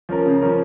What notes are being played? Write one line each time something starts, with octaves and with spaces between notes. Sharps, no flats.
F3 C#4 A#4
C#3
F3 C#4 A#4